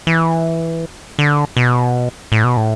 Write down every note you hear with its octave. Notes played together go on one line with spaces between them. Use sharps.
E3
D3
B2
A2
B2
A2